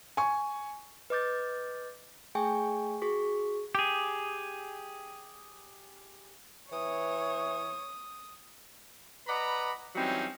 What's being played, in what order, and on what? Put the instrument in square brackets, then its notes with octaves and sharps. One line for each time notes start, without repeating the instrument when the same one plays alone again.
[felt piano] G#5 C#6
[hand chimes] B4 D#5 D6 G6 A6
A3 G#4 G5 G#5 C#6
F#4 G#4 C#6 B6
[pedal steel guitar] G4 G#4
[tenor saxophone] E3 [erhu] C#5 [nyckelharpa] D#6
[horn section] B4 D5 D#5 F#5 A#5 B5
E3 F#3 G3 C4 C#4 D#4